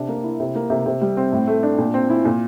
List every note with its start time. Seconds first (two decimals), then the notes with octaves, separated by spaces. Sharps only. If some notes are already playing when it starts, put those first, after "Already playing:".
Already playing: C3 D4
0.08 A#3
0.24 E4
0.40 C3
0.55 A#3
0.70 C3
0.86 C3
1.01 G3
1.17 C4
1.32 A2
1.48 A3
1.63 D4
1.78 A#2
1.94 C4
2.10 E4
2.25 A#2